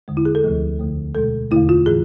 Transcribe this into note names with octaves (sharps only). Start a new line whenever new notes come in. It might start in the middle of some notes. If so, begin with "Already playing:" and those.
E2 D3 G#3
E4
G#4
A4
D2 C3 F3 A3
E2 D3 A3
B2 G#3 A4
E2 D3 A3 E4
F4
A2 E3 G#4